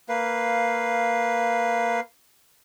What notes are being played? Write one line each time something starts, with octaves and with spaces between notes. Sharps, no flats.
A#3 B4 F5